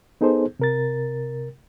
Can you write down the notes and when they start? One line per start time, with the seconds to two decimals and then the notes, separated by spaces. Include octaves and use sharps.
0.21 B3 D#4 G#4 A4 C5
0.59 C3 A#4 A6